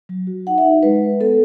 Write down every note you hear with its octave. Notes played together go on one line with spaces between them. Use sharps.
F#3
F#4
D#4 F#5
E5
D#4
G#3 B4
G#3
B3 A4